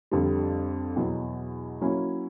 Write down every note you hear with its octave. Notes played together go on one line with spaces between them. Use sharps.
F2 D3 G3
E2 B2 F#3
F#3 A#3 C#4 E4